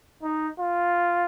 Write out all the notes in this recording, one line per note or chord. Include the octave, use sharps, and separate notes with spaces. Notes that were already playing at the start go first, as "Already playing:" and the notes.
D#4
F4